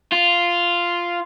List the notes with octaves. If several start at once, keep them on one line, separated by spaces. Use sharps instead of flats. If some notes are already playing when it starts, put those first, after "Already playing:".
F4